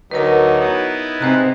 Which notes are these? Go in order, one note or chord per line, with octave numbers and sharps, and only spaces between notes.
D2 F#3 D#4 A#4 B4
B3 D#4 E4
G#2 C3 C5 A#5 F#6